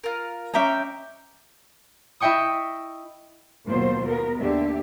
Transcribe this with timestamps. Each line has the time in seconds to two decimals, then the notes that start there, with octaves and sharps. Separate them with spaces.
0.04 F4 A#4
0.54 C#4 D#5 E5 G5 A#5 D6
2.20 E4 D#5 E5 G5 C#6 D#6
3.65 D#2 B2 F#3 F4 C5
4.05 B3 A#4
4.40 D#2 D3 G4 E5